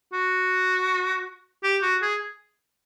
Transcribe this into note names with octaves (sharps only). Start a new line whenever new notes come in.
F#4
G4
F#4
G#4